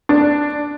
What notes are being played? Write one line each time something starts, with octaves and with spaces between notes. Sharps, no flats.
D4